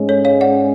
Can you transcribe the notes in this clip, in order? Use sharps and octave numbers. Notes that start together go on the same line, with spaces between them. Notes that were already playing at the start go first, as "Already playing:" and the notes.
Already playing: G#2 G#3 C#4
A4 C#5
C#5 F5
D5 F#5